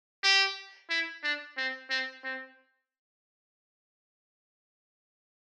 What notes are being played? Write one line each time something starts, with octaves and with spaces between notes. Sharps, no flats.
G4
E4
D4
C4
C4
C4